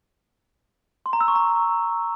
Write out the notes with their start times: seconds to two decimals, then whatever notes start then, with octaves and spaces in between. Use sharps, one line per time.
1.06 C6
1.13 A#5
1.21 E6
1.28 C#6
1.36 A#5